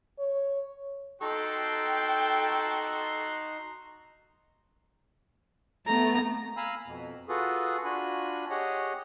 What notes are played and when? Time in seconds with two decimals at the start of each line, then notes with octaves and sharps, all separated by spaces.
0.19 C#5
1.22 D#4 F#4 A4 G5 A#5 C6
5.87 A3 B3 A#5
6.57 F5 G#5 A#5 B5 E6
6.86 F2 B2
7.28 F4 F#4 G#4 A4 B4
7.84 D4 F4 F#4 G#5 B5
8.50 G4 G#4 C#5 D#5 F#5